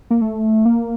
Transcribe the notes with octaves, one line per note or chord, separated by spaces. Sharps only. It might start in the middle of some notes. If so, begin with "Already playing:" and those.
A#3
A3
A#3